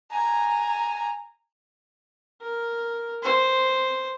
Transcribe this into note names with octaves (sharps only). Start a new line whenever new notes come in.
G#5 A#5
A#4
C5